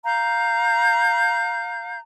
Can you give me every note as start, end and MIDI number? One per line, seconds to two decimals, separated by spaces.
0.04 1.98 77
0.04 1.98 82
0.04 1.98 91